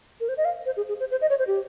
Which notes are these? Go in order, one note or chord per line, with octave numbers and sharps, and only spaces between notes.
A#4
C5
D#5
F5
C5
G#4
G#4
C5
C5
D#5
C#5
C5
G4